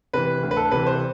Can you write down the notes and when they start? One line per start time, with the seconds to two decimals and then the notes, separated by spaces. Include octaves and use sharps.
0.13 C3 E3 B4
0.42 D2
0.51 B4
0.57 A4
0.71 C3 E3 B4
0.86 C5